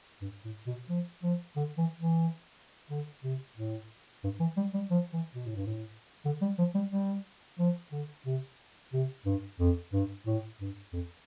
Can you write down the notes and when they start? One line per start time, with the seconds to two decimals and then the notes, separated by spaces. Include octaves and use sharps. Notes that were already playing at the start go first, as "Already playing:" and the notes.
0.21 G2
0.45 A2
0.67 B2
0.89 F3
1.23 F3
1.56 D3
1.78 E3
2.00 E3
2.90 D3
3.24 C3
3.56 A2
4.24 G2
4.40 E3
4.57 G3
4.74 G3
4.90 F3
5.13 E3
5.35 B2
5.46 A2
5.56 G2
5.66 A2
6.25 D3
6.42 G3
6.58 F3
6.74 G3
6.92 G3
7.59 F3
7.92 D3
8.26 C3
8.93 C3
9.26 G2
9.60 F2
9.93 G2
10.27 A2
10.61 G2
10.93 F2